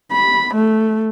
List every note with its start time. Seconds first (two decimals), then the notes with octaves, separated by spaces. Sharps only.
0.13 B5
0.54 A3